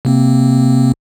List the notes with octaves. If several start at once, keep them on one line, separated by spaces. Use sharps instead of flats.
C3 A#3 C4